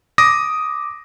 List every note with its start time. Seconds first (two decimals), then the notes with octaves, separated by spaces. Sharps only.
0.18 D6 D#6 A#6